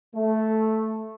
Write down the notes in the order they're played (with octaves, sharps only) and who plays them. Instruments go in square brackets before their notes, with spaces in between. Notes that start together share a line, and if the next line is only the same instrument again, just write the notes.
[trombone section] A3